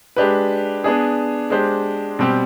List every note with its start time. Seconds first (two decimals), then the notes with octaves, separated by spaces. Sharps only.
0.16 G#3 D4 G4 B4
0.84 B3 D4 G#4
1.50 G#3 D4 G4 C5
2.19 B2 G3 C4 G4